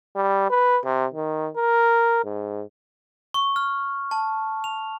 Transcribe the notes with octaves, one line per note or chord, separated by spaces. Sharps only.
G3
B4
C3
D#3
A#4
G#2
C#6
F6
A5
F7